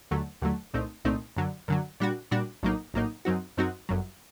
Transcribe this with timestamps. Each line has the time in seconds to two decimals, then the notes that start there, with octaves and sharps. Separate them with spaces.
0.11 D#2 D3 F#3 A3
0.42 D#2 D3 F#3 A3
0.73 C2 A#2 A3 C4 D#4
1.05 C2 A#2 A3 C4 D#4
1.36 F#2 D3 F#3
1.68 F#2 D3 F#3
2.00 A#2 G3 D4 F#4
2.31 A#2 G3 D4 F#4
2.63 A#1 A2 F#3 A#3 D#4
2.94 A#1 A2 F#3 A#3 D#4
3.25 F#2 F#3 C4 D#4 F#4
3.57 F#2 F#3 C4 D#4 F#4
3.89 G1 F#2 F#3